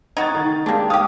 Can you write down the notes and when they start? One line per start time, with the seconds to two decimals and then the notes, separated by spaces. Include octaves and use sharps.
0.17 D#4 F#4 G#6 A6
0.35 D#3
0.47 D#3
0.66 G#3 A#3 D4 G4
0.90 G4 F5 D6 D#6